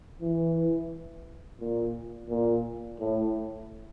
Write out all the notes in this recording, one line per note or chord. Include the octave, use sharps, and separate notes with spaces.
E3
A#2
A#2
A2